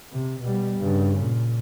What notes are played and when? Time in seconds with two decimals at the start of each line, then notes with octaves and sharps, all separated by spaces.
0.13 C3
0.42 B2 G3
0.78 G2 C#3
1.19 A#2